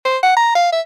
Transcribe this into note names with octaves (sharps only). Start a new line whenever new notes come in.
C5
F#5
A#5
F5
E5